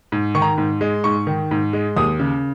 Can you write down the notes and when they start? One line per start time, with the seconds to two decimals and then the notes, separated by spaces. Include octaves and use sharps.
0.12 G#2
0.35 D#3 C#6
0.42 A#5
0.58 G#2
0.81 G#3
1.04 G#2 C#6
1.27 D#3
1.51 G#2
1.73 G#3
1.97 D#2 D#6
2.19 C#3